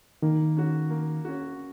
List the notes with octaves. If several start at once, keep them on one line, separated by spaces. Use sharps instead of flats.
D#3 A#3
C#4 F#4
A#3
C#4 F#4